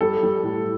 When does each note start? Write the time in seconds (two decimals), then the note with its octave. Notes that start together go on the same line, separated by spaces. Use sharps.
0.01 G3 A4
0.23 G3
0.43 A2